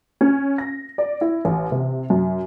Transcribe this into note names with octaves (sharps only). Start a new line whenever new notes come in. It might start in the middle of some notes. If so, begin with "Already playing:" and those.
C#4
A#6
D5
E4
A1
C3
F#2